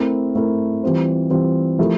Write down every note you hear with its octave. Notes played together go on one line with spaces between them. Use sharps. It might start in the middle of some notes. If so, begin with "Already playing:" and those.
Already playing: A3 C4 E4 A#4
A3 C4 E4 A#4
E3 G3 C4 F4 C5
E3 G3 C4 F4 C5
F3 A3 E4 G4 A#4